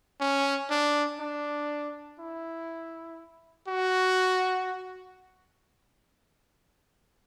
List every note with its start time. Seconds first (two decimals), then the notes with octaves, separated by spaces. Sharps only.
0.21 C#4
0.70 D4
1.20 D4
2.20 E4
3.68 F#4